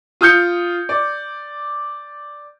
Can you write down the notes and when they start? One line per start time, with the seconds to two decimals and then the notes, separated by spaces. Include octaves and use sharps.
0.21 F4 D#6 G6 C#7
0.89 D5